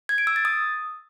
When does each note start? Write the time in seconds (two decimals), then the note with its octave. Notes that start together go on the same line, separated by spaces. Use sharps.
0.09 G#6
0.18 D7
0.27 E6
0.36 A6
0.45 D#6